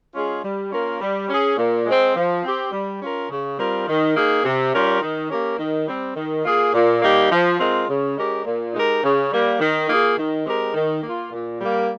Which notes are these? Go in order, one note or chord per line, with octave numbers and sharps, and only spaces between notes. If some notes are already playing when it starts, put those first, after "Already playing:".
G#3 C#4 F4 G#4
G3
A#3 C#4 F4 A#4
G3
C#4 G#4
A#2
G#3 C4
F3
C4 G4
G3
C#4 F4 A#4
C#3
G3 C4 F4 A#4
D#3
A#3 D#4 G#4
C3
G3 C#4 F4 A#4
D#3
A#3 C#4 G4 A#4
D#3
G3 C4
D#3
A#3 F4 G#4
A#2
G3 A#3 D#4 G4
F3
G#3 C4 F4 A#4
C#3
G#3 C#4 G4 A#4
A#2
G#3 D#4 G4 A#4
C#3
G3 A#3
D#3
A#3 F4 G#4
D#3
G#3 C4 G4 A#4
D#3
A#3 F4
A#2
G3 A#3